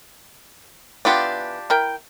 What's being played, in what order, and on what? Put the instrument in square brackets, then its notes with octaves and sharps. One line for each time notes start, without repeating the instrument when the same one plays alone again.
[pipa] E3 B3 B4 [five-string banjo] D4 F4 G4
[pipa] E4 A#4 G5